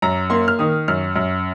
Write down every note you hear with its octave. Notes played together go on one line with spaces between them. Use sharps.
F#2 A#5
A#3 C6
F6
D#3 D#6
F#2 F6
F#2